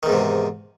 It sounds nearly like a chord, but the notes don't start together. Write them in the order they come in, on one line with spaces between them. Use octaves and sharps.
D#3 E2 G#2 C3